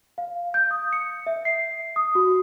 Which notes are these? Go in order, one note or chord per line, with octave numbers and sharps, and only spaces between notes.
F5
G6
D#6
C#7
E5
C7
D#6
F#4